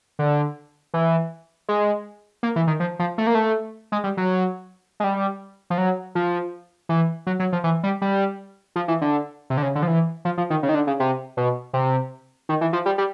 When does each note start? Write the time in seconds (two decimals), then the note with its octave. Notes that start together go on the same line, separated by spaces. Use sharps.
0.19 D3
0.94 E3
1.68 G#3
2.43 A#3
2.56 E3
2.67 D#3
2.80 F3
2.99 F3
3.18 A3
3.27 A#3
3.35 A3
3.92 G#3
4.04 G3
4.17 F#3
5.00 G#3
5.04 G3
5.70 F3
5.78 F#3
6.15 F3
6.89 E3
7.27 F#3
7.40 F#3
7.53 F3
7.64 E3
7.83 G3
8.02 G3
8.76 F3
8.88 E3
9.01 D3
9.50 C3
9.57 D3
9.63 C#3
9.75 D3
9.82 F3
9.87 E3
10.25 F3
10.38 F3
10.50 D#3
10.63 C#3
10.69 D#3
10.75 D3
10.87 C#3
11.00 C3
11.37 B2
11.73 C3
12.49 D#3
12.61 E3
12.73 F3
12.86 G3
12.98 G3